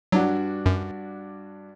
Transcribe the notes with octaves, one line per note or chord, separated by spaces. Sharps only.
G2 F#3 D4 F#4
F#2